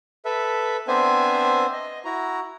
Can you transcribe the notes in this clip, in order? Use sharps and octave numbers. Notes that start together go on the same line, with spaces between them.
A4 B4 E5
B3 C4 D4 C5 E5 G#5
D#5
E4 F#4 A#5